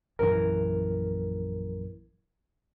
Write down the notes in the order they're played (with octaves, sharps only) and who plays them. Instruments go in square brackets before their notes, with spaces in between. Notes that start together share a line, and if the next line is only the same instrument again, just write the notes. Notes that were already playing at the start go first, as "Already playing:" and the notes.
[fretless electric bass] A#1 F#2 E3 [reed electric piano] A#4